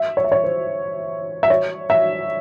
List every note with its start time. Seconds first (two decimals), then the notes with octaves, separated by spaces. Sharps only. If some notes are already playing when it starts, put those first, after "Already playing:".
Already playing: E5
0.17 C#5
0.24 E5
0.32 C#5
0.44 C5
1.43 E5
1.50 C#5
1.90 E5